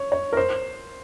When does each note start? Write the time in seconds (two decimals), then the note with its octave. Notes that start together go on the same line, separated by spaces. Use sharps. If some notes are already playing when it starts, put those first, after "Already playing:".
Already playing: C#5
0.12 C#5
0.33 A#4
0.37 C5